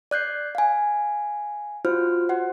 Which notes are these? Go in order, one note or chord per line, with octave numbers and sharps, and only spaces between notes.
D5 F#6 G6 C7
F5 G#5
F4 F#4 C5 F6
F#4 C5 F#5